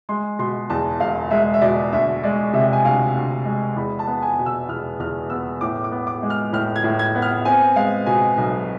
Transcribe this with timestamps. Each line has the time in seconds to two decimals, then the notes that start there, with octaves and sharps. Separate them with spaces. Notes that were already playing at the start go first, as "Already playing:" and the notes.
0.09 G#3 C6
0.39 B2 C6
0.70 E2 A5
1.00 E1 F5
1.31 G#3 E5
1.54 E5
1.62 B2 D5
1.93 D2 E5
2.23 G#3 D5
2.53 C3 E5
2.73 G#5
2.85 D2 F5
3.15 D2
3.45 G#3
3.76 E2 B5
3.99 A5
4.07 B3
4.22 G#5
4.39 B2
4.46 E6
4.68 E2 F6
4.99 E2 F6
5.30 B3 E6
5.61 A2 D6
5.84 D6
5.92 B3
6.07 D6
6.23 G#3
6.30 F6
6.53 A2 F6
6.76 G#6
6.84 A2
6.99 G#6
7.15 B3
7.22 F6
7.45 C4 G#5
7.76 G#3 F5
8.06 B2 G#5
8.37 B1